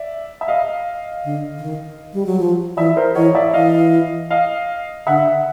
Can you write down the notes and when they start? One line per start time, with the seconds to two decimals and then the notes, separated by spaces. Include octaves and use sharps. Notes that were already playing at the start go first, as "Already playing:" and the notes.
Already playing: D5 E5
0.41 E5
0.48 D#5 F5
1.24 D3
1.58 D3
1.63 D#3
2.13 G3
2.26 F#3
2.39 F3
2.77 E3 D5 E5
2.96 A#4 C5
3.15 E3 C#5 D#5
3.35 D5 E5
3.54 E3 D#5 F5
4.30 D#5 F5
5.07 D3 E5 F#5